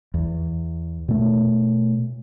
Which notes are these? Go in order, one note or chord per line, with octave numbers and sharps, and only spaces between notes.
E2
B2 A3